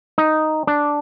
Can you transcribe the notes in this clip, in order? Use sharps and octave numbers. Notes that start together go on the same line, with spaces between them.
D#4
D4